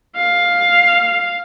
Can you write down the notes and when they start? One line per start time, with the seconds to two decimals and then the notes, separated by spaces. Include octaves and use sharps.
0.17 F5